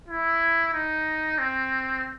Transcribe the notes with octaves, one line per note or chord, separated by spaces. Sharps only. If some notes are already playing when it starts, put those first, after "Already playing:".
E4
D#4
C4